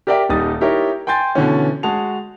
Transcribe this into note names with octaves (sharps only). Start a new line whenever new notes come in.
G4 A#4 D5 E5 G5
D#1 G3 D#4 D#6 A6
D#4 E4 G4 A#4 C#5
G5 G#5 C6 G6 A6
B2 D3 E3 C#4
G#3 F#4 G#4 A5 F7